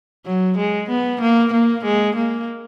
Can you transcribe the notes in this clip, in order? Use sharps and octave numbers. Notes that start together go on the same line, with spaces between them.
F#3
G#3
B3
A#3
A#3
G#3
A#3